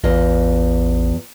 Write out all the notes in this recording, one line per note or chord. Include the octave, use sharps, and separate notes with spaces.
A1 E2 F4 D#5